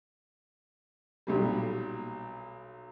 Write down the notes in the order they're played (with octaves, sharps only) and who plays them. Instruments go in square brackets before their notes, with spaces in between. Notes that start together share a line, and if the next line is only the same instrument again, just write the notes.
[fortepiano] B1 A#2 G3